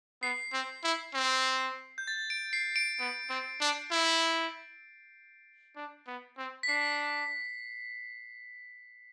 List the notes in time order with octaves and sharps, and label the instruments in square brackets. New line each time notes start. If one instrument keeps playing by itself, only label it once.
[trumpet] B3 [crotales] C7
[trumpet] C4
E4
C4
[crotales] G6
A6
D7
C7
D7
[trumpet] B3 [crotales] D7
[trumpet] C4
D4
E4
D4
B3
C4
[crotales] B6
[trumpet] D4 [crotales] C7